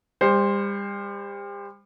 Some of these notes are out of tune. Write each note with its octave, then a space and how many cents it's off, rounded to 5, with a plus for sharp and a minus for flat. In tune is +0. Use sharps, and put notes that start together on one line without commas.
G3 +35 C5 +0